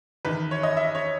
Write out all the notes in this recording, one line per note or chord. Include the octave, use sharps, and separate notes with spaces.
E2 D#3 B4
C#5
D#5
E5
C#5